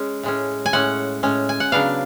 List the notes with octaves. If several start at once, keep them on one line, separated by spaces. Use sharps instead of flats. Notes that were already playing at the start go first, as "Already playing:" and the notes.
Already playing: G#3 C#4
A2 G#3 C#4
G#5
A2 G#3 C#4 F#5
A2 G#3 C#4
G#5
F#5
C#3 F#3 B3 D4 F5